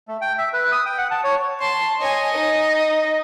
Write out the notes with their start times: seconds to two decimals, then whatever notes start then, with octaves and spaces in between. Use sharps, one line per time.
0.08 A3
0.21 G5
0.38 E5
0.53 B4
0.72 D#6
0.86 G5
0.98 F#5
1.11 A5
1.24 C#5
1.61 A5 C6
2.01 C#5 D#5 G#5
2.34 D#4